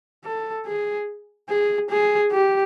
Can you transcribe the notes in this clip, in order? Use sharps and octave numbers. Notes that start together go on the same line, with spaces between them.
A4
G#4
G#4
G#4
G4